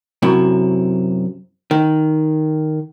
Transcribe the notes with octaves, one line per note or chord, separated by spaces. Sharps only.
F#2 C3 E4
D#3